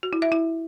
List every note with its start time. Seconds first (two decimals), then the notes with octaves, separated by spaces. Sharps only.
0.03 F#4
0.13 E4
0.22 E5
0.32 E4